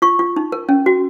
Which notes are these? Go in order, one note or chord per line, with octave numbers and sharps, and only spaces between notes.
F4 C#6
F4
D#4
A#4
C#4
F#4